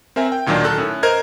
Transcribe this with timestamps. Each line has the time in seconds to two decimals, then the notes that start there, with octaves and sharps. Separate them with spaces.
0.16 C4 A#4 E5 G#5
0.32 G5
0.46 D2 A#2 D#3 F#3 A#3 D4
0.64 D#3 A4 F#6
0.78 A2 C#4
1.03 A#4 C5 D#5 G#6